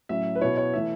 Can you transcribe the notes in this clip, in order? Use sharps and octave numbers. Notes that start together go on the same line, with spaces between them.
A2 F#3 C#4 E5
B4
B2 B3 E4 C#5
C#5
E3 A3 E5